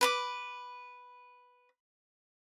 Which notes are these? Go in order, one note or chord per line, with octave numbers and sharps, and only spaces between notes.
B4 B5 D6